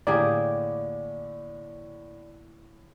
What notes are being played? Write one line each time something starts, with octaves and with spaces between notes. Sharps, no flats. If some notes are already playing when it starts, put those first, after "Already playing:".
A2 D3 A#3 G4 G#4 D5